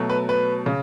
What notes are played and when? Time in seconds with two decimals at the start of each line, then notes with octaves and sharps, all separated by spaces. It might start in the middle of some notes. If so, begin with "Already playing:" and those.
Already playing: B2 F#3 A3
0.10 B4
0.29 B4
0.66 C#3